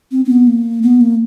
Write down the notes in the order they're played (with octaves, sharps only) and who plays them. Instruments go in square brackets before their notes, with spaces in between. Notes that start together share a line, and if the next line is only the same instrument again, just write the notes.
[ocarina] C4
C4
B3
A#3
B3
A#3